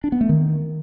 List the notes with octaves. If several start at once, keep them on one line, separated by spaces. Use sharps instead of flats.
D4
B3
A3
D#3